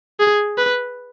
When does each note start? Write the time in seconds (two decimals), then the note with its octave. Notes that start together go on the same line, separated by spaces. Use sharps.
0.20 G#4
0.58 B4